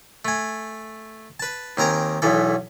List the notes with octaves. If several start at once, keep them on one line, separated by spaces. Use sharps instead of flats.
A3 G#5
B4 A5
D#2 C4 A#4 G#5 A#5
B1 E2 E3 A4